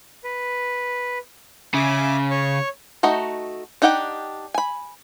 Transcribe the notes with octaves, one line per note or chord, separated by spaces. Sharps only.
B4
C#3 E5 G#5 D6
C#5 C#6
A3 D#4 F#4 D#5
D4 D#4 G4 F#5 G5
G#5 B5